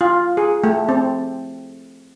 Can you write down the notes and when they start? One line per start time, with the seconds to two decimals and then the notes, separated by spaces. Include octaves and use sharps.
0.01 F4
0.37 G#4
0.64 A3
0.89 C4